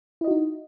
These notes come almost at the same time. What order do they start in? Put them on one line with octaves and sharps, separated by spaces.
E4 D#5 F#4 D#4